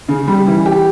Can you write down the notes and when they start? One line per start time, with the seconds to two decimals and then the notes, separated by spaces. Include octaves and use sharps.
0.08 C#3
0.28 G3
0.47 E3
0.66 G4